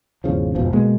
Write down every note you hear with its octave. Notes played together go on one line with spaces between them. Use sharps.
G#1 E2 C#3 F3
E1 G#2 B2 F3
B2 G#3 A#3 B3